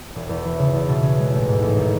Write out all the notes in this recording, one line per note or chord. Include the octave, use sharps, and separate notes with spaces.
E1
E2
E3
C#3
E2
B2
C#4
G#3
A1
G#2
A1
D#3